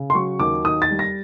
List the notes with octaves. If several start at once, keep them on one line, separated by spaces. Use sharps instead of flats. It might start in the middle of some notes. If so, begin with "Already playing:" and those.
Already playing: C#3
C6
F#3 C#6
D#2 D6
D#3 D#6
A6
G3
A#6